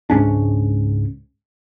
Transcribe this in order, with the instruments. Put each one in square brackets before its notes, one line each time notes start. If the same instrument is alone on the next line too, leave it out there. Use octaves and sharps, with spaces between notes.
[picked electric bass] C#2 G#2 C#4 D4